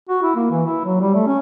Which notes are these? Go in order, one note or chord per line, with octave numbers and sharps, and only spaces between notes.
F#4
E4
A#3
E3
E4
F#3
G3
A3
C#4